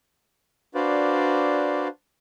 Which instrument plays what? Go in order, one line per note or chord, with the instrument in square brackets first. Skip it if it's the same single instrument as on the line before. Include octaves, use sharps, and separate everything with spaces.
[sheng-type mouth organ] D4 F#4 B4 C5 D5 F5